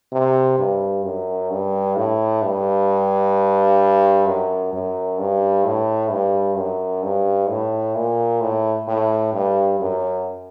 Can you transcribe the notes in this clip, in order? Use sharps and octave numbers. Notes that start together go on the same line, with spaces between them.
C3
G2
F#2
G2
A2
G2
F#2
F#2
G2
A2
G2
F#2
G2
A2
A#2
A2
A2
G2
F#2